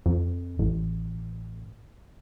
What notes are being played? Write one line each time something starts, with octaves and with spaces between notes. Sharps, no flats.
F2
A1